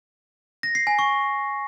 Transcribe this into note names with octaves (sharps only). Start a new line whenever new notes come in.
A#6
C7
G#5
C#6